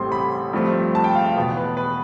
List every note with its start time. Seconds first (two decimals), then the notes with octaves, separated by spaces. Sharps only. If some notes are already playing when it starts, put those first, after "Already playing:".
Already playing: A1 A2 G3 C4 C6
0.12 B5
0.53 G2 F3 A3 C4
0.95 A5
1.04 G5
1.15 F5
1.26 F5
1.36 E2 B2 B3
1.57 B4
1.77 B4